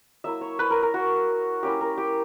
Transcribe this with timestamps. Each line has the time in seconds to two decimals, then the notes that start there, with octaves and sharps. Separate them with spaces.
0.24 F#3 A#3 E4 E5
0.41 C#5
0.59 B4
0.70 A#4
0.82 A#4
0.94 F#4
1.63 A#3 C#4 E4 G4
1.81 A#4
1.98 G4